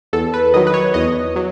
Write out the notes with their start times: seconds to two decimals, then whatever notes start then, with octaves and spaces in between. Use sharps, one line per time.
0.13 E2 A4
0.34 B4
0.54 D#3 F#3 D#5
0.67 B4
0.74 C#5
0.94 E2 D#5
1.36 F#3